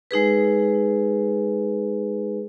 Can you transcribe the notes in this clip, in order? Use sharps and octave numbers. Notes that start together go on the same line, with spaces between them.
G#3 D#4 G#4 B4